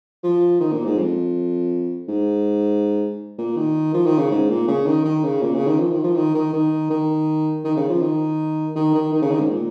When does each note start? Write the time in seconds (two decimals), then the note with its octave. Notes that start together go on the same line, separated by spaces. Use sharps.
0.23 F3
0.60 D#3
0.73 A#2
0.85 G#2
0.97 F2
2.08 G#2
3.38 A#2
3.56 D#3
3.94 F3
4.06 D#3
4.18 C#3
4.31 G#2
4.49 A#2
4.68 C#3
4.86 D#3
5.05 D#3
5.24 C#3
5.42 A#2
5.55 C#3
5.67 D#3
5.79 F3
5.92 D#3
6.04 F3
6.16 D#3
6.34 D#3
6.53 D#3
6.90 D#3
7.64 D#3
7.77 C#3
7.89 F3
8.02 D#3
8.75 D#3
8.94 D#3
9.13 D#3
9.22 C#3
9.31 D#3
9.40 G#2
9.50 A#2